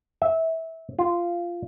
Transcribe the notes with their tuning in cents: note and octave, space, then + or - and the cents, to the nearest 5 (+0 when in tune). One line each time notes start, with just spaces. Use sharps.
E5 -20
F4 -10